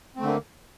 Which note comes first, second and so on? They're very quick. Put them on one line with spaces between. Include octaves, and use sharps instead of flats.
C4 A3 D3 A#3